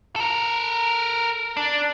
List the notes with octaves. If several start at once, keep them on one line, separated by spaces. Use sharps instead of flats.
A4 A#4
D4